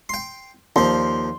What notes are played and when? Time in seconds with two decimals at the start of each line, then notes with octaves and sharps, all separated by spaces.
0.09 G5 C6
0.76 D#2 F3 C6